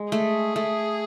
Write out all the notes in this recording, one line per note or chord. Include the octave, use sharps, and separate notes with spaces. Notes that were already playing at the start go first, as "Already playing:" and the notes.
Already playing: G#3
A3 G#4
A3